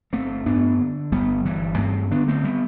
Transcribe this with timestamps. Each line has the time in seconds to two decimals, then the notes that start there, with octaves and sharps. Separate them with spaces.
0.13 G1 A3 C4
0.46 G2 B3 D4
0.79 D3
1.12 G1 G3 B3
1.45 G1 E3 G3
1.78 G2 A3 C4
2.11 D3 B3 D4
2.28 A3 C4
2.44 G3 B3